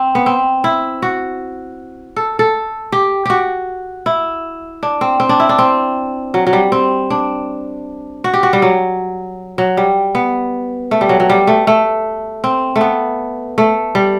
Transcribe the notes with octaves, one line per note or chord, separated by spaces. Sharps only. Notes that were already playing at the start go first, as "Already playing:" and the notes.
Already playing: C4
B3
C4
E4
F#4
A4
A4
G4
F#4 G4
E4
D4
C4
C4
D4
E4
D4
C4
F#3
F#3
G3
C4
D4
F#4
G4
F#4
G3
F#3
F#3
G3
B3
A3
G3
F#3
F#3
G3
A3
A3
C4
A3
B3
A3
G3